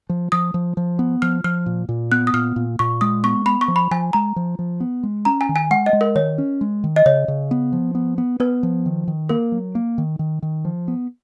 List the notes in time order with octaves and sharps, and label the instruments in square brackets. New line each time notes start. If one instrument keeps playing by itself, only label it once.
[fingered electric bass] F3
[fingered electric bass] F3 [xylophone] D#6
[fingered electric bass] F3
F3
B3
[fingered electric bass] F3 [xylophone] F6
[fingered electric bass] F3 [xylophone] F6
[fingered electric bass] A#2
A#2
[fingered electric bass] B3 [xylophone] F#6
[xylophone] D#6
[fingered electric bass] A#2 [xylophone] F6
[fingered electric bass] A#2
[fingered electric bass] A#2 [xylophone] C#6
[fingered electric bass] G#3 [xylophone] D#6
[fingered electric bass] B3 [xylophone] C#6
[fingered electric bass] B3 [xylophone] B5
[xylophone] C#6
[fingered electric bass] F3
[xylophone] B5
[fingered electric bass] F3 [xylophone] G#5
[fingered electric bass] G#3 [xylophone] A#5
[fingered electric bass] F3
F3
B3
G#3
[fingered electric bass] C#4 [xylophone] A#5
[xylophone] G#5
[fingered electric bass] D#3
[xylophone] G#5
[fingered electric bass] G#3 [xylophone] F#5
[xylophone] D#5
[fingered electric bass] G#3
[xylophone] A#4
[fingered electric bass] D#3 [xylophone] C#5
[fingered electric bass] C#4
G#3
D#3
[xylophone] D#5
[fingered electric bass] C#3 [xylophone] C#5
[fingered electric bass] C#3
B3
F3
B3
B3
[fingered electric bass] B3 [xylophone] B4
[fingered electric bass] F3
D#3
D#3
[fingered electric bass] A#3 [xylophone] A#4
[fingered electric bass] F#3
A#3
D#3
D#3
D#3
F3
B3